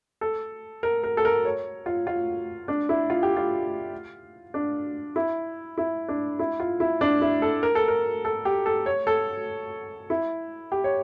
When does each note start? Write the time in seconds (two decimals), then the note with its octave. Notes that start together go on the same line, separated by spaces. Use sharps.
0.21 A4
0.83 A#4
1.04 A#4
1.17 A4
1.25 A#4
1.45 C#5
1.86 F4
2.07 F4
2.68 D4
2.89 E4
3.10 F4
3.23 G4
3.37 F4
4.54 D4
5.16 E4
5.78 E4
6.08 D4
6.39 E4
6.60 F4
6.80 E4
7.01 D4
7.21 E4
7.42 A4
7.63 A#4
7.75 A4
7.88 A#4
8.25 A4
8.45 G4
8.66 A4
8.86 C#5
9.07 A4
10.10 E4
10.72 G4
10.84 C#5